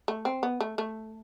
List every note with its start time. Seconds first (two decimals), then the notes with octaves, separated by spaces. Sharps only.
0.08 A3
0.25 C4
0.43 B3
0.60 A3
0.78 A3